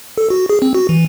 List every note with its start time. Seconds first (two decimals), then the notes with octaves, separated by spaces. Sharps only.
0.18 A4
0.30 F#4
0.49 G#4
0.62 C4
0.75 F#4
0.89 E3